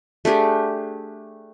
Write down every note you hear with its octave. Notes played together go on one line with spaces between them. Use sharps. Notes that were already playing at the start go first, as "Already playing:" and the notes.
A3 D4 G4 G#4